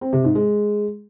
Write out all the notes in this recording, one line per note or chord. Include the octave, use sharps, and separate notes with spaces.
C4
C3
G#2
G#3